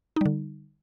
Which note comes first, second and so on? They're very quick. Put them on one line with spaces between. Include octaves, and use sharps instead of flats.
D#4 G3 D3